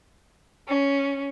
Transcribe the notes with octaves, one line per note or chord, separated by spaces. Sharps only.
C#4